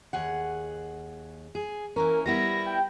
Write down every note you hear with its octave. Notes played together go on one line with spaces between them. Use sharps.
D#2 G#4 F#5
G#4
E3 A#3 C#4 A#4
G3 B3 E4 A#6
G5